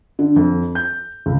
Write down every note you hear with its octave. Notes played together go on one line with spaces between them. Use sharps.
D3
F2
G6
C#2